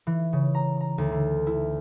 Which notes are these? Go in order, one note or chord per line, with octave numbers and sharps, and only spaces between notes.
E3
C#3
A#5
A#5
D2
D3
E4